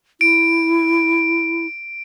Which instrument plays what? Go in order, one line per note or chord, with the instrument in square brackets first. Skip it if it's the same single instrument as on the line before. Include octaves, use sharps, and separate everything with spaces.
[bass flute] E4 [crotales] D7